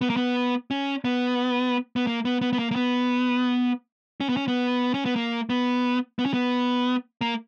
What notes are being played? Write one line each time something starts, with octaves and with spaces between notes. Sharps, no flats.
B3
A#3
B3
C#4
B3
B3
A#3
B3
B3
B3
A#3
A#3
B3
C#4
B3
C#4
B3
C#4
B3
A#3
B3
B3
C#4
B3
A#3